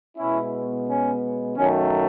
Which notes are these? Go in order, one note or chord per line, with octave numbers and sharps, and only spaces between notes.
B2 G#3 B3 C#4 E4
C#4
F#2 D#3 F#3 A3 C#4